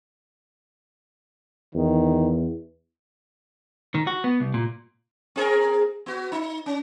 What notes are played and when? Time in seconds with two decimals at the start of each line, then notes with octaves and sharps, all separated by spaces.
1.75 E2 D#3
3.95 D#3
4.07 F#4
4.24 B3
4.40 C2
4.54 A#2
5.36 C4 G#4 A#4
6.06 B3 F#4
6.32 D#4
6.66 C#4